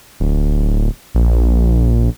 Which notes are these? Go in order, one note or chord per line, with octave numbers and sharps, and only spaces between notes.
D1
A#1